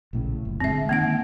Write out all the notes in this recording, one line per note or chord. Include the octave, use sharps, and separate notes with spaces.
A#1 A2 C#3
F#1
D3 G#3 C4 E5
D#3 A#3 C4 F#5